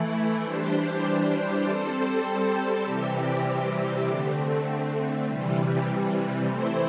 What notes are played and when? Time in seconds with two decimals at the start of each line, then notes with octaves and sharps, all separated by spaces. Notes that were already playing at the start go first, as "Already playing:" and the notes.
Already playing: E3 A3 E4
0.43 E3 G3 D4 G4 C5
1.65 G3 C4 A4 C5
2.85 C3 E3 G3 C4 G4
4.07 D3 A3 C4
5.26 C3 E3 G3
6.47 E3 A3 C4 E4 C5